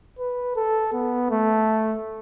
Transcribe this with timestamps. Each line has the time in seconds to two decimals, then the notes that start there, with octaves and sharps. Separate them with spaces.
0.19 B4
0.56 A4
0.93 B3
1.30 A3